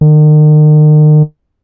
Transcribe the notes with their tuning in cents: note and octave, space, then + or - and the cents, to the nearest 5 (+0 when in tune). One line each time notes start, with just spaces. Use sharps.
D#3 -40